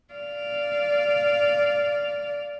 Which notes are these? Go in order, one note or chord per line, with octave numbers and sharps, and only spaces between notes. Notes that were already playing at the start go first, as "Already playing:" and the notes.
D5 F5